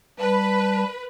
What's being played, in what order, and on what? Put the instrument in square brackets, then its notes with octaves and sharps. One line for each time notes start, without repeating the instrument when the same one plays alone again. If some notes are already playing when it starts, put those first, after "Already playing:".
[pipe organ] G3 A5 [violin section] B4